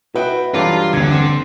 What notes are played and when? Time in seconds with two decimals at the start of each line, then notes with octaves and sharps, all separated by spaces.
0.15 E4 F#4 B4 D#5 G5
0.54 G2 E3 F#3 D4 F4 G4 A4
0.94 D#1 D3 G#6
1.11 C4